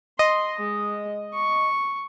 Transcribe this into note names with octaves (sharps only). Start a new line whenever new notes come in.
D#5 C6
G#3
C#6